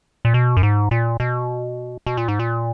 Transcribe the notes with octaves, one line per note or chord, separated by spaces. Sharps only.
A#2
B2
F#2
G#2
A#2
B2
B2
A#2
G#2
A#2